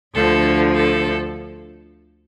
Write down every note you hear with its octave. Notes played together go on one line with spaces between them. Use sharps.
D2 D3 F3 A4
A4